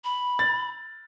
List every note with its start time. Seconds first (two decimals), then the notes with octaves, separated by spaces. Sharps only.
0.04 B5
0.39 A6